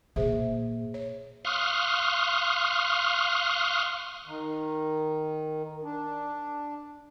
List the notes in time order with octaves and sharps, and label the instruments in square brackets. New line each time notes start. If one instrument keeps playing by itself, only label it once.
[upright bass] A#2 [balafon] G#4 C5 E5
[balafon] C#5
[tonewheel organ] F5 C6 C#6 D#6 F6 F#6
[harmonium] D#3
D4